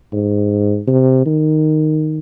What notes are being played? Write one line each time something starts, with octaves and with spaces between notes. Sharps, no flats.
G#2
C3
D#3